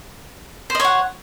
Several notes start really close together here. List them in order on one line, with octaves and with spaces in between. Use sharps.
C5 D#5 C#5 F#5